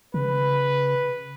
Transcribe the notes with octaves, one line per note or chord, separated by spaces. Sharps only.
C#3 B4